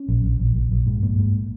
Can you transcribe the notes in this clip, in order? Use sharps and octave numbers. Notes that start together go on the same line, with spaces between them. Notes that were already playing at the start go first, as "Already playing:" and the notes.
Already playing: C#4
A#1
A#1
A#1
A#1
A#1
G#2
G#2 A#3
G#2